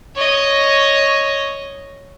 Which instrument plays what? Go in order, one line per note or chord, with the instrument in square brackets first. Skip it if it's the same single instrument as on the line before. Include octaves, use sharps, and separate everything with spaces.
[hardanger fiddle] C#5 D#5